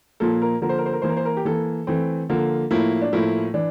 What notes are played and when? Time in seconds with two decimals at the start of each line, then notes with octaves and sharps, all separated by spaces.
0.20 A#2 F3 A#3 A4
0.42 A#4
0.62 D3 F3 A#3 A#4
0.69 C5
0.78 A#4
0.86 C5
0.93 A#4
1.02 E3 A#3 C5
1.09 A#4
1.17 C5
1.25 A#4
1.37 G4
1.45 E3 A#3 A4
1.87 E3 A3 C4
2.29 D3 F3 A#3
2.71 A2 F3 A#3 E4
3.02 D4
3.13 A2 F3 A#3 E4
3.54 E3 D4